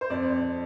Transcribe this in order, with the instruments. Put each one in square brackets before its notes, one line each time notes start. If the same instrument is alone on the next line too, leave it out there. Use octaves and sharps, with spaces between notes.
[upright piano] C5
F2 D5
F2